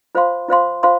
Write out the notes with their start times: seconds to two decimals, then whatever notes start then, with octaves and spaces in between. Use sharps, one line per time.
0.15 F4 C5 F5 C6
0.48 F4 C5 F5 C6
0.83 F4 C5 F5 C6